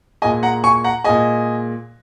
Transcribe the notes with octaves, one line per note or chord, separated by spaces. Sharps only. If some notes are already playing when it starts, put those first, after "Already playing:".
A#2 G#3 D#5 G#5
F#5 A#5
G#5 C#6
F#5 A#5
A#2 G#3 D#5 G#5